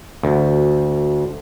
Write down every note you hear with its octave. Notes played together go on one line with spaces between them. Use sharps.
D2